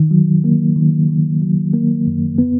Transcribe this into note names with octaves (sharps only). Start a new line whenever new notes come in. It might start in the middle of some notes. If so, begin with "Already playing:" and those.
Already playing: D#3
F#3
A#3
D#3
D#3
F#3
A#3
F#2
B3